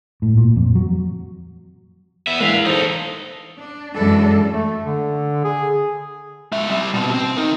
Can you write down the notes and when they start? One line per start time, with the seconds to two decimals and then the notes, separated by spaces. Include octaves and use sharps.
0.22 A2
0.37 A#2
0.56 F2
0.75 F#3
2.27 B3 E5
2.41 E3 G#3 A#3 B4 F5
2.66 D#4 A4 C5
3.59 D4
3.94 F#2 E3 G#3 D4 A4
4.54 A3
4.84 D3
5.44 G#4
6.52 G#3 E5
6.70 G3 C4
6.94 B2 C4
7.14 C4
7.37 D#4 A#4